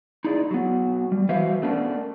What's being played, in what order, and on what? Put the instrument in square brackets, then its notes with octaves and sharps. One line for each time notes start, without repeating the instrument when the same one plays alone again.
[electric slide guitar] D#4 E4 G#4 D5
F#3 B3
G3
E3 F#4 B4 C5 E5 F5
A3 B3 C#4 D4 A#4